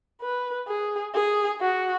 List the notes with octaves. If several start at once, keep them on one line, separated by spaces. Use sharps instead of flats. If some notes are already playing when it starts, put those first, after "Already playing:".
B4
G#4
G#4
F#4